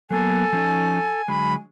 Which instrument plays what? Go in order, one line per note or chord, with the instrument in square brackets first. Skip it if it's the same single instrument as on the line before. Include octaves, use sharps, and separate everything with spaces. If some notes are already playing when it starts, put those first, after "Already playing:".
[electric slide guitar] F#3 A#3 B3 [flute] A4 [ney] G#5
[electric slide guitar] F3 C#4 D#4
[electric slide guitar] D3 F#3 G#3 [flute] B5